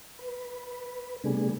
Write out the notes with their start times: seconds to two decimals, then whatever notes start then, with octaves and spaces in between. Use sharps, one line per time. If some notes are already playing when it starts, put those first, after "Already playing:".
0.19 B4
1.24 C3 G3 A3 B3 D4 G#4